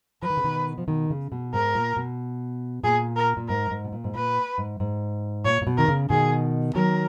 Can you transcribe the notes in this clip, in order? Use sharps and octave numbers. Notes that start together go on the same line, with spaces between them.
F3 B4
D#3
C#3
B2 D#3
F3
B2 D#3
C#3
B2
G#2 A#4
A#2
B2
A#2 G#4
A#4
A#2
G#2 A#4
G#2
B2
A#2
G#2
A#2 B4
G#2
G#2
A#2 C#5
A#2
B2
D#3 A#4
C#3
B2 D#3 G#4
D#3 F#3 A#4